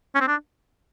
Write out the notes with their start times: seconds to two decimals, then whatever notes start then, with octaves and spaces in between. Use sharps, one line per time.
0.15 C#4
0.21 C4
0.28 D4